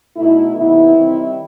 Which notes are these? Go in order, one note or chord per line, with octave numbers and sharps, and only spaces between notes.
B2 A3 D#4 E4
C3 E3 B3 D#4 E4
D#3 G3 C4